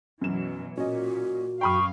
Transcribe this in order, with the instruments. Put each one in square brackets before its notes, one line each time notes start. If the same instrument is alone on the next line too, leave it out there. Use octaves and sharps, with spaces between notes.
[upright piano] F#2 E7 [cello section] B2 E3 F#3
[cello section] A#2 [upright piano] C#4 D#5 [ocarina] F#4
[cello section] F#2 F5 [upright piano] G5 B5 D#6 [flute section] C#6